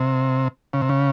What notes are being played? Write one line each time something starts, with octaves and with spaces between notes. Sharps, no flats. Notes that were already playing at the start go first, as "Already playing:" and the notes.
Already playing: C3
C#3
C3
C#3